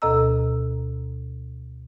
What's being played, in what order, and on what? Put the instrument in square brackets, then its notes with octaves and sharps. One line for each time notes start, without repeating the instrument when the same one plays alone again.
[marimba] D2 B2 A4 D#5 A#5 E6